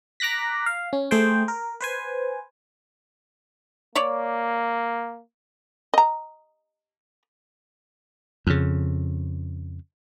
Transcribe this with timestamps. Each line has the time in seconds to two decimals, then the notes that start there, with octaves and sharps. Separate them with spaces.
0.20 A#5 D6 F#6 A#6 B6
0.66 F5
0.93 C#4
1.11 A3 G#4 C5 G5
1.48 A#4
1.81 B4 C5 G#5
3.95 A#3 C#5 D5
5.94 D#5 A#5
8.47 F2 C#3